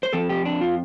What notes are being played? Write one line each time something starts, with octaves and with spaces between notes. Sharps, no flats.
C5
F2 F3 C4 A4
G4
D4
F4